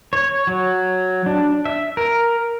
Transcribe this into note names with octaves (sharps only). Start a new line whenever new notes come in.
C#5
F#3
D4
E5
A#4